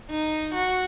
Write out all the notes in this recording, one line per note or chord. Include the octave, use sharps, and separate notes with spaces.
D#4
F#4